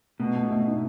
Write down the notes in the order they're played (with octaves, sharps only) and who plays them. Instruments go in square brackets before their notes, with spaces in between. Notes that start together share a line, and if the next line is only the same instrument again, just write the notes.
[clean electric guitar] B2 [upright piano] A3
[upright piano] A3
A3
D#4